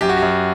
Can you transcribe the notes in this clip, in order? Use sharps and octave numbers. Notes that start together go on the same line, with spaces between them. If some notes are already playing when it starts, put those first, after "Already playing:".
F#2 G4
F#4
F#2 G4